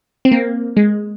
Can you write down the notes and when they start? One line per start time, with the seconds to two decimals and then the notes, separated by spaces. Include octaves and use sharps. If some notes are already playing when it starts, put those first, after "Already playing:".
0.25 C4
0.32 A#3
0.77 G#3